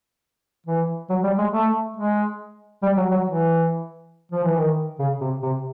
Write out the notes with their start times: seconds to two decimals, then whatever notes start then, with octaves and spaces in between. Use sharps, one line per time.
0.67 E3
1.10 F#3
1.24 G3
1.38 G#3
1.53 A3
1.97 G#3
2.82 G3
2.97 F#3
3.11 F#3
3.26 E3
4.32 F3
4.44 E3
4.56 D#3
4.99 C#3
5.21 C3
5.43 C3